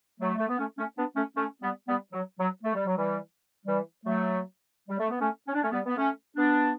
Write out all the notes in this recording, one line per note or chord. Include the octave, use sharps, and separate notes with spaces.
F#3 A3
A3
B3
A3 C#4
A3 C#4
B3 D4
A3 C#4
A3 C#4
G3 B3
G3 B3
F#3
F#3
A3
G3
F#3
E3 G3
E3 G3
F#3 A3
G3
A3
B3
A3 C#4
C#4
D4
A3 C#4
G3 B3
B3
A3 C#4
B3 D4